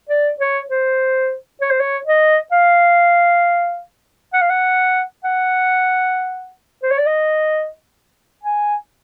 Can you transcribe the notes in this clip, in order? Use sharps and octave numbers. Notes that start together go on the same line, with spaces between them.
D5
C#5
C5
C#5
C5
C#5
D#5
F5
F#5
F5
F#5
F#5
C5
C#5
D5
D#5
G#5